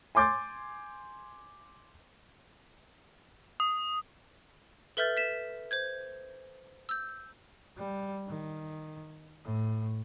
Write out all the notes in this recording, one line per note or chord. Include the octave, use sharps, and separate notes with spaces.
G#5 C6 D6 G6 A6
D#6
A4 B4 E5 F6 G6 A6
B6 E7
C5 G6 G#6
E6 G6
G3
D#3
A2